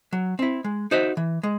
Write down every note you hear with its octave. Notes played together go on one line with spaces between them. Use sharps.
F#3
C4 E4
G#3
D#4 F#4 C5 E5
E3
G#3